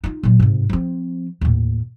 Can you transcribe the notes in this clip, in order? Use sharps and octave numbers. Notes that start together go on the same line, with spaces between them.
D#4 F4
A#2 F#3
G#2 C3
F3 C4
D#2 A2